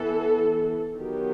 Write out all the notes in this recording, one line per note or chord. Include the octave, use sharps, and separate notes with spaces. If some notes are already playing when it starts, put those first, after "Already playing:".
Already playing: E3 B3 A4
D#3 F#3 B3 G4